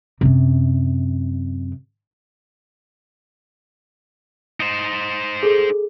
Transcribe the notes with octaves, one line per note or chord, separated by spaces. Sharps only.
F#2 C3
D#4 C5
G#4 A4